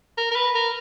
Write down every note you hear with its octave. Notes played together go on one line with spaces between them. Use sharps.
A#4
A#4
B4
A#4